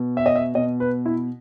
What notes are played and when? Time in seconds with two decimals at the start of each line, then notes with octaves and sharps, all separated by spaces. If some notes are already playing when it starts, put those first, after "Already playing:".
Already playing: B2
0.17 E5
0.26 D#5
0.36 E5
0.54 B2 D#5
0.80 B4
1.06 E4